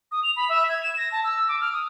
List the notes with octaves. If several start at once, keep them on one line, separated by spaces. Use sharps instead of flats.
D#6
F7
B5
E5
G#6
E7
A#6
A5
E6
D6
F6
D#6